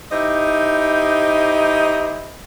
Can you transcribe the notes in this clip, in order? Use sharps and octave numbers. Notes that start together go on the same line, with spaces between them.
D#4 E4 G4 C5 D#5